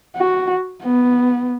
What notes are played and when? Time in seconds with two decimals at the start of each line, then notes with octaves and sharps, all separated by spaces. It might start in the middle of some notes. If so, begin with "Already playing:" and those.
0.16 F#4
0.83 B3